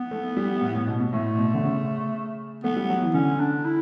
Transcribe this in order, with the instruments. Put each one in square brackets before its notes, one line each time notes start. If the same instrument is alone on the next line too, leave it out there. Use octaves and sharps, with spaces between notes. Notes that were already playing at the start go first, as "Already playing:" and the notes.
Already playing: [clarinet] B3
[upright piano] A3
G3
A2
A2
B2
B2
[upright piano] A2 [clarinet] A3
[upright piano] B2
D3
C#3
[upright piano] A3 [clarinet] B3
[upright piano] G3
F#3
E3
[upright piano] D3 [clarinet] C#4
[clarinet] D4
E4